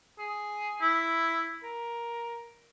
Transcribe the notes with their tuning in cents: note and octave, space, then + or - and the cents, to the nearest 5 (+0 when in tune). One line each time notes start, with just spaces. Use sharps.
G#4 +5
E4 +0
A#4 +10